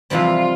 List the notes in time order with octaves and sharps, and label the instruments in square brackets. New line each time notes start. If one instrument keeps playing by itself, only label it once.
[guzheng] F2 C3 E3 G3 C4 [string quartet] F4